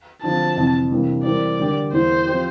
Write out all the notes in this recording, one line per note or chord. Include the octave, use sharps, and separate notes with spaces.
D3 F3 C4 A5
F2 C3 E3
C3 E3 G3 A#3 D4
E3 G3 C4 G4 A#4 D5
D3 G3 D4 G4 A#4
E2 E3 A#3 E4 C5
F3 C4 G4